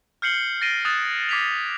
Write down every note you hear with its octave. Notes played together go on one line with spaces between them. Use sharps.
F6 G6 C7 C#7 F#7 G7
A6 A#6 C7 D7 D#7 G7
D#6 F#6 G#6 A6 E7
D6 G#6 B6 C7 F7